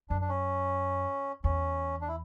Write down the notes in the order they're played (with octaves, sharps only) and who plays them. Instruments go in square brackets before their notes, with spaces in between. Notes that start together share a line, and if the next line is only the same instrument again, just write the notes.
[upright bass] F#2 [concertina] D4
[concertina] D4
C#4
[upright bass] E2 [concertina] C#4
[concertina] D4
E4